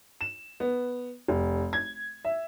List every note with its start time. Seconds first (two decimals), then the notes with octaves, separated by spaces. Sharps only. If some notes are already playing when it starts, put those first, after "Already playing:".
0.21 E7
0.60 B3
1.28 F1
1.73 G#6
2.25 E5